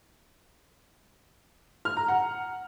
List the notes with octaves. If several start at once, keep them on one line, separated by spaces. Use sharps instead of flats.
F6
A#5
F#5